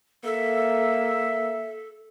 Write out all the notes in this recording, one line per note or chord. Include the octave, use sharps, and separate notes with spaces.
A#3 A4 E5